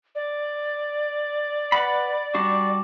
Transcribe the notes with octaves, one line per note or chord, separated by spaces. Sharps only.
D5
B4 F#5 B5
G3 D4 F#4